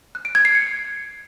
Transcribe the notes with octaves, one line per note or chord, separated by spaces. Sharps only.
F#6
D7
G#6
C7
C#7